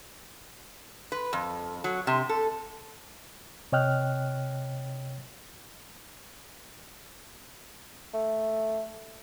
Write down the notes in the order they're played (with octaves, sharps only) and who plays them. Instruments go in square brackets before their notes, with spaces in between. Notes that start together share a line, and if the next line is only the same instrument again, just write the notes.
[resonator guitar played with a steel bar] B4
F2
F#3
C3
A4
[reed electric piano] C3 C#5 D#5 G5 F6 F#6
[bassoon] A3